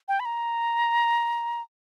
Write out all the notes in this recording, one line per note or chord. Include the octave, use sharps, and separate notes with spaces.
G5
B5
A#5